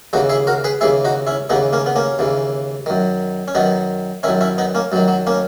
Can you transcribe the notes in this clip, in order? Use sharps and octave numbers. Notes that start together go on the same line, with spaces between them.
D#2 C#3 E3 D#4 F#4
E4 G#4
F#4 A#4
G#4 B4
D#2 C#3 E3 E4 G#4
D#4 F#4
C#4 E4
D#2 C#3 E3 B3 D#4
A#3 C#4
B3
A#3 C#4
D#2 C#3 E3
F#2 D#3
C#4
F#2 D#3 B3 D#4
F#2 D#3 C#4 E4
C#4 E4
B3 D#4
A#3 C#4
F#2 D#3 F#3
F#3
A#3 C#4